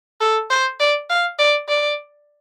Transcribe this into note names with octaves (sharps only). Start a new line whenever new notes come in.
A4
C5
D5
F5
D5
D5